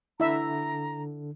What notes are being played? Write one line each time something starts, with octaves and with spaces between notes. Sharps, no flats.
D3 E4 E5 A#5